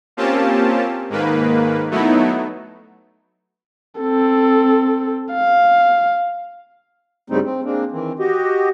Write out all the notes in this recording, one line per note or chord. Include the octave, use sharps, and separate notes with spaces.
A#3 C4 C#4 F4 G4 A5
G#2 D#3 A#3 B4
F#3 A3 B3 D#4 E4
C4 A4
F5
G2 C#3 G3 A3 C4 D#4
C4
G#3 A#3 C4 D4
D#3 E3 C4
F#4 G4 D#5